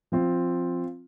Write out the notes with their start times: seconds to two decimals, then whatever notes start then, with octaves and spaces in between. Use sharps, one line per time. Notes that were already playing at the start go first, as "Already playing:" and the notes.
0.12 F3 C4 F4